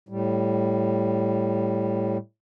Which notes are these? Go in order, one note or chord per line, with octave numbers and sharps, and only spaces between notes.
A2 G3